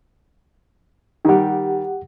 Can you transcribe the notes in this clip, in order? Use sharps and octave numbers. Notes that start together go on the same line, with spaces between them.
D#3 G3 G4 F#5